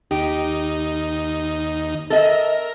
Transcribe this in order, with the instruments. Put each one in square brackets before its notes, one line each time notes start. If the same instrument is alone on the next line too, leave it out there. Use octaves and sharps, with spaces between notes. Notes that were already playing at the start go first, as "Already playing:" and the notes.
[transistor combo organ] D#2 D#4 [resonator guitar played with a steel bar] G4
[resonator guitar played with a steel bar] A4 D#5 E5 [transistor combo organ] A#4